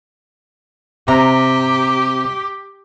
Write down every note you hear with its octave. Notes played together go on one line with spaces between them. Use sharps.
C3 G4 A#5